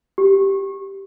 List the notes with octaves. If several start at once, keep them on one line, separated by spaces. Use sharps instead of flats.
G4